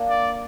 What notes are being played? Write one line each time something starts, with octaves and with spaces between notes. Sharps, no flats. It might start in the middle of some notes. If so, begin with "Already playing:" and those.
Already playing: A#3 D4
D5